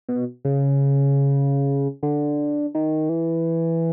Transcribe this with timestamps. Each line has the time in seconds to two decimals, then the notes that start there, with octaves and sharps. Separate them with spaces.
0.09 B2
0.45 C#3
2.03 D3
2.75 D#3
3.09 E3